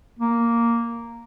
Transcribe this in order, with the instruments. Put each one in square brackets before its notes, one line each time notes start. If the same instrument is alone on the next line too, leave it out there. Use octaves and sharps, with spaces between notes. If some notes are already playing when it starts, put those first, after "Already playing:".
[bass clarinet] A#3